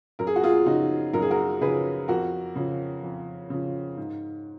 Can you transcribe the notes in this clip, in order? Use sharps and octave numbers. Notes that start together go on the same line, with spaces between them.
F#2 A#4
G#4
F#4
F4 G#4
C#3 F3 D#4 F#4
F#2 A#4
G#4
F#4 A#4
C#3 F3 G#4 B4
F2 F#4 A#4
C#3 F3
F2
C#3 F3
G#2